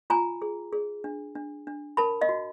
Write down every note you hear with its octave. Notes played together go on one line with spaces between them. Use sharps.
F4 G#5 A#5
G#4
G#4
D4
D4
D4
A#4 A5 B5
D#5 F5
F#4